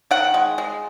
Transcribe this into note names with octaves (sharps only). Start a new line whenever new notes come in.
D#3 F#5
G#3
G#3